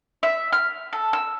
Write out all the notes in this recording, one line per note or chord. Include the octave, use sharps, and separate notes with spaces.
E5
F6
A4
E6